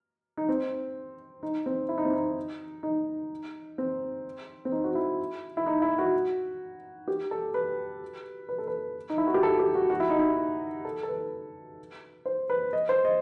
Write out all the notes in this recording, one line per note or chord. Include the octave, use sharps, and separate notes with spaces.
D#4
C4
D#4
C4
E4
D#4
C4
D#4
D#4
C4
C4
D#4
F#4
E4
E4
D#4
E4
F#4
G4
A4
B4
B4
A4
B4
D#4
E4
F#4
G4
A4
G4
F#4
F#4
E4
D#4
E4
A4
A4
B4
C5
B4
D#5
C5
D#5